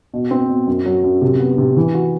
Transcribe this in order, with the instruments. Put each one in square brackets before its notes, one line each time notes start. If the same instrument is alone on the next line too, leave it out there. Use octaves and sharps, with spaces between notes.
[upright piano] B2
C4
B2
F#2
F#3
F#2
C3
B3
C3
E3
F#4